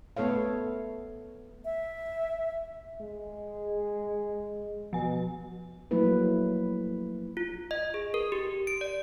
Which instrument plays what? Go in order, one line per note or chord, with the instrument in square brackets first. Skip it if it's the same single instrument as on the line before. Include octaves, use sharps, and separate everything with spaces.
[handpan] A3 B3 A4 C#5 F5
[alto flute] E5
[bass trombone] G#3
[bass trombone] B2 [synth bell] F3 G#5
[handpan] F3 F#3 A3 A#3 E4 B4
[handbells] F4
D#5
G#4
A#4
G4
D7
D5